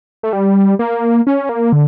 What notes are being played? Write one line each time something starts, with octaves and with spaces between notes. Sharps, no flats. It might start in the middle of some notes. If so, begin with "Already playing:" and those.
A3
G3
A#3
C#4
A#3
D3